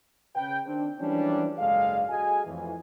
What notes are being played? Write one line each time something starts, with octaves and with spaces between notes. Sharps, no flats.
C#3 B4 G5
D#3 C4 D4
E3 F3 G3 G#3 C#4 D4
F#1 G#2 G#3 A4 D5 F5
F#4 G#4 A4 D#5 G#5
F2 A2 E3